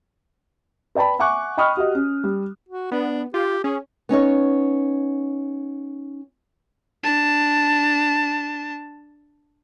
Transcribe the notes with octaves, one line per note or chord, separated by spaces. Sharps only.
B4 D5 G5 A5 B5
E5 F#5 G#5 C#6 D6 F#6
D#5 G5 B5 C#6 D#6 F6
F#4 G4 D#5
C#4
G3
F#4
B3 D4
F4 G4
C#4 G#4
B3 C#4 D#4 C#5
D4 A5